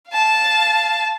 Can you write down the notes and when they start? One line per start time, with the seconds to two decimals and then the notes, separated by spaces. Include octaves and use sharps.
0.11 F5 A5